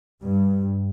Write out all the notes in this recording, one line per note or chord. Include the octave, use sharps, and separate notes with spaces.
G2